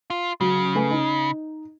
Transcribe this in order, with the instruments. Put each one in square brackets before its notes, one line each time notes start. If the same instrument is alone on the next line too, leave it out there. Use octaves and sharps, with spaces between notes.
[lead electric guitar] F4
[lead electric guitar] C#3 [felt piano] F#3
[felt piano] A3 B4 G#5
D#4